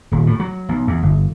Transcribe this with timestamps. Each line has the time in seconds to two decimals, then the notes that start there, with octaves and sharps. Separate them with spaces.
0.12 D#1
0.27 A2
0.40 F#3
0.69 B1
0.87 E2
1.03 G1